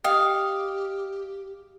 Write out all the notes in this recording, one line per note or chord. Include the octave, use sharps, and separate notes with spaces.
G4 D#5 F5 G5 D#6